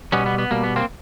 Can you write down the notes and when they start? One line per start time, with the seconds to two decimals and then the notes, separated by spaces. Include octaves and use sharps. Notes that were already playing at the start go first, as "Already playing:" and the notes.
0.12 B2 G3 B3 C#4
0.26 B3
0.38 B3
0.51 B2 G3 A#3
0.64 B3
0.76 A#3 C4